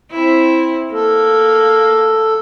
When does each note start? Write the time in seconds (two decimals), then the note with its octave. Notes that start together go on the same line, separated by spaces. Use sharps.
0.11 C4 E4
0.92 A#3 A4